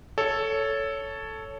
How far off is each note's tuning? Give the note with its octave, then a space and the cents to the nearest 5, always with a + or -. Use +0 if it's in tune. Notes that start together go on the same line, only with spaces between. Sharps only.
A4 +0 C#5 +10